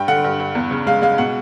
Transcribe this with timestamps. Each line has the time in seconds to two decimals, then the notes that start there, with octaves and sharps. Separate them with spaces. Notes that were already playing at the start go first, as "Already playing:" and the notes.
Already playing: G2 G5
0.08 D3 F#5
0.24 G2
0.40 G2
0.55 E2
0.71 C#3
0.87 G#3 F5
1.02 G#3 F5
1.18 B2 F#5